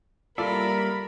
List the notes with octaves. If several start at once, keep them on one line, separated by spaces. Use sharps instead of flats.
G3 A#3 F4 A4 A#4 D5 E5 B5